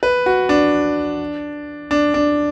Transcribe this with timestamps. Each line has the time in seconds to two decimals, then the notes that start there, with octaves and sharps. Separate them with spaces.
0.03 B4
0.26 F#4
0.49 D4
1.91 D4
2.14 D4